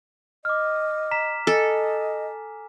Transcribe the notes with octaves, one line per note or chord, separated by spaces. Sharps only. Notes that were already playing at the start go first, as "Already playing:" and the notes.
D#5 D6 F6
A#5 B6 E7
A4 D#5 G#5